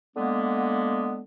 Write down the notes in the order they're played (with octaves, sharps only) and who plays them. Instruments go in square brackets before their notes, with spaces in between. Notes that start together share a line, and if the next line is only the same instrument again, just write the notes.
[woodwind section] D3 G#3 A#3 B3